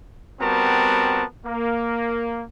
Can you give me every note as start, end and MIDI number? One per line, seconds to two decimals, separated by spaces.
0.41 1.23 55
0.41 1.23 59
0.41 1.23 60
0.41 1.23 66
0.41 1.23 70
0.41 1.23 81
1.46 2.42 58